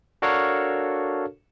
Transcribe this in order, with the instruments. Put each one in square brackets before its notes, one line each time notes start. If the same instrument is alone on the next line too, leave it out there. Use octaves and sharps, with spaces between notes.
[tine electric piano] D4 F#4 A4 A#4 C#5 F5